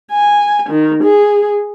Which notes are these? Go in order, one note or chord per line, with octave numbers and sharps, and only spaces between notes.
G#5
D#3
G#4